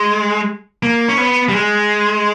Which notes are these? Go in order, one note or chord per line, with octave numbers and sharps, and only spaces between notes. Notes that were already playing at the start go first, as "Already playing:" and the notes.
Already playing: G#3
A#3
C#4
B3
G3
G#3